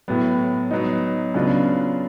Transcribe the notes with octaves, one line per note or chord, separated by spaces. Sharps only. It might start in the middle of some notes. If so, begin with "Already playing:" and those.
A2 F#3 B3
F#3 B3 D#4
C#3 F#3 B3 D4 F4